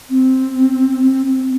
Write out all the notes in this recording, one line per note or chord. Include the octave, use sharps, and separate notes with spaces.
C4
C4
C4